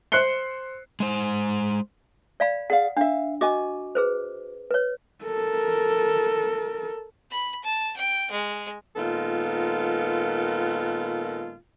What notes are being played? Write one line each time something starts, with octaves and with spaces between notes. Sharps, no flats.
C5 F#6 C7 C#7 G7
G#3 C5
D5 F5 B5
G#4 D5 F5 F#5
D4 E5 F5
F#4 D#5 G#5 D6
G#4 B4 C5
B4 C#5
A4 A#4
B5
A5
G5
G#3
A#2 D#3 G#3 B3 F4 A4